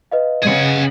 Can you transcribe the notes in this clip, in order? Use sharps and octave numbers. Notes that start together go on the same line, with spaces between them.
B4 D#5 F5
C#3 G#4 F#5